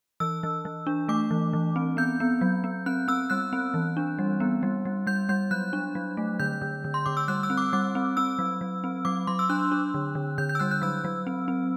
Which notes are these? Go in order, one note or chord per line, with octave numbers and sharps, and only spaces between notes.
E3 E6
E3
E3
D4
A3 D6
E3
E3
C4
B3 G6
B3
F#3
B3
C4 F#6
C4 E6
G3 F#6
C4
E3
D4
G3
B3
G3
G3
G3 G6
G3 G6
F#3 F#6
D4
F#3
A3
D3 G6
D3
D3
C6
D3 D6
E6
G3 F#6
E6
C4
D6
G3 D6
C4
C4 E6
F#3
F#3
C4
F#3 D6
F#3 C6
E6
D4 F#6
D4
D3
D3
D3 G6
G6
E6
G3 F#6
F#6
F#3 E6
F#3
C4
C4